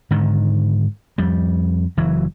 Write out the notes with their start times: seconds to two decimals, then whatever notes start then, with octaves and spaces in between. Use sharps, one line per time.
0.11 G#2 D3 D#3
1.18 F2 G3
1.97 F#1 E3 F#3